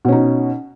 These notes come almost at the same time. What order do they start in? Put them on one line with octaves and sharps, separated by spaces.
B2 C#4 D#4